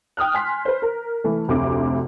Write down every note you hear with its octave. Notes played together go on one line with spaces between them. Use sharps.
G5 D#6 F6 F#6
G#5 C6 B6
B4 C5
A#4
E3 A3
F1 D2 C3 D6